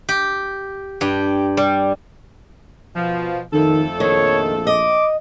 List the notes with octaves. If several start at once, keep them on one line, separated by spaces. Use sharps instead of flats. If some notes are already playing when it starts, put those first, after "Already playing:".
G4
G2 G4
G3
B2 F3
F2 D#3 A3 A4
A#1 D#3 C#5
D#5 D6